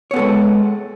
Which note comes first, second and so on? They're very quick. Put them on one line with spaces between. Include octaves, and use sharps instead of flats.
C#5 B3 A4 G#3